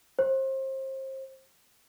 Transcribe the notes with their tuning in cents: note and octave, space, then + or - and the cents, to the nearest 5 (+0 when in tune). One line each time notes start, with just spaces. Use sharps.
C5 +30